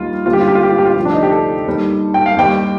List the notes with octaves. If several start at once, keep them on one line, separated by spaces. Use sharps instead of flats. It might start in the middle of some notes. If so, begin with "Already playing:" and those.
Already playing: D#2 D#3 G3 F4
D#2 D3 G3 F4
G4
F4
G4
F4
G4
F4
G4
F4
D2 C3 F3
D4
D#4
G4
A4
D#2 D#3 G3
G5
F5
D#2 D#3 G3 G5